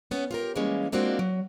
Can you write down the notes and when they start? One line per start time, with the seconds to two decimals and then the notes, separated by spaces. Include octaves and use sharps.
0.11 B3 C#4
0.31 F4 G4 A#4
0.56 E3 G3 G#3 A#3 C#4
0.92 G#3 A#3 C4 D4 F4 F#4
1.19 F#3